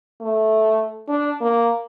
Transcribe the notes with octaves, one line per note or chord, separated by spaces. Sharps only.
A3
D4
A#3